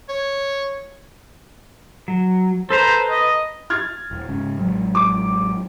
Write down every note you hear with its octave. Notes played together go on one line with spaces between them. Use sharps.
C#5
F#3
A4 B4 C5 A#5
D#5
F6 G#6 A6
E1
G#2 C#3
A1 F#3 G#3
D6